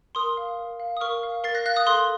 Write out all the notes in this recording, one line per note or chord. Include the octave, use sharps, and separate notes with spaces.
A#4 C6 D#6
F5
A#4
F5
D#6
A#4 C#6 F6
F5
A#4 A6 C7
F#6 A#6
F5 F#6 A#6
D#6 F#6
A4 C6 D#6